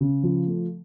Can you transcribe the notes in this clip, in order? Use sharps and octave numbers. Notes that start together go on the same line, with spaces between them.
C#3
F3
A3